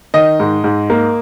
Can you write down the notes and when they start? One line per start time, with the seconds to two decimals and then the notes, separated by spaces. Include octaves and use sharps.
0.14 D#3 D#5
0.40 G#2
0.64 G#2
0.90 A#3